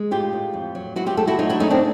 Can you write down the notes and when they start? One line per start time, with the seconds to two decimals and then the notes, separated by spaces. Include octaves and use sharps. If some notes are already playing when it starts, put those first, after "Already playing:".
Already playing: G#3
0.11 A2 F4 G4
0.33 A2
0.53 F2
0.75 F#3
0.96 F#3 E4 F#4
1.06 F4 G4
1.17 A3 G4 A4
1.27 E4 F#4
1.39 F#3 D#4 F4
1.49 D4 E4
1.60 A3 C#4 D#4
1.70 C4 D4